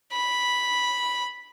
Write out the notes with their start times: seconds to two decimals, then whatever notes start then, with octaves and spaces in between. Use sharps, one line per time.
0.12 B5